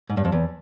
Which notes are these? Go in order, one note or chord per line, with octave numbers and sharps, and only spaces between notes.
G#2
G2
F2
E2